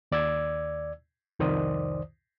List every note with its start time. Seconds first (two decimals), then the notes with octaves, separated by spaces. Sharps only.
0.12 D#2 D5 E6 G#6
1.39 C2 F2 D#3 C5 D5 D#6